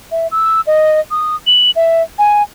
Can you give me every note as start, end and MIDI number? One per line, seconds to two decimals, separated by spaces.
0.11 0.27 76
0.31 0.61 88
0.67 1.00 75
1.11 1.36 87
1.47 1.71 102
1.76 2.03 76
2.18 2.43 80